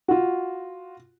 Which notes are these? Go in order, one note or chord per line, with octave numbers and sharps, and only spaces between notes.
F4 F#4